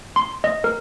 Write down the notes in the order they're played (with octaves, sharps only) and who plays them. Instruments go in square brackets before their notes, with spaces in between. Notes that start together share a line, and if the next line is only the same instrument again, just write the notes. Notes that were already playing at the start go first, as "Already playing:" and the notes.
[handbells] C6
D#5
A#4